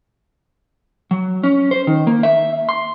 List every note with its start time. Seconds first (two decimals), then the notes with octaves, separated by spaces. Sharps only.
1.11 F#3
1.43 C#4
1.71 C5
1.87 D#3
2.07 A#3
2.23 E5
2.69 C6